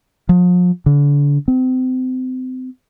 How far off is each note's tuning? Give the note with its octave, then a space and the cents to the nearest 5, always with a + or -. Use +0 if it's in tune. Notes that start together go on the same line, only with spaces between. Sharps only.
F3 +40
D3 -35
C4 -35